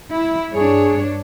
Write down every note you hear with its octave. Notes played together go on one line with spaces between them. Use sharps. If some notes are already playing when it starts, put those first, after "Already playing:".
E4
G2 D4 G#4 C#5